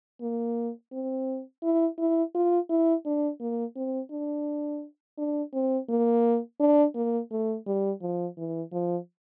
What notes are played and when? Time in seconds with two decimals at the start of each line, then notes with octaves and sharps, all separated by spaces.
0.21 A#3
0.92 C4
1.63 E4
1.98 E4
2.35 F4
2.69 E4
3.05 D4
3.40 A#3
3.76 C4
4.11 D4
5.18 D4
5.53 C4
5.89 A#3
6.60 D4
6.95 A#3
7.31 A3
7.67 G3
8.02 F3
8.38 E3
8.72 F3